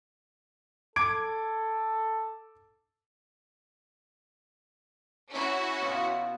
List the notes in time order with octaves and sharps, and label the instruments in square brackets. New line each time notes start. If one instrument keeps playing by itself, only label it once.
[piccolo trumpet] A4 [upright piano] D6 G#6 D7
[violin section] C#4 E4 F#4
[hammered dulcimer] B2 F4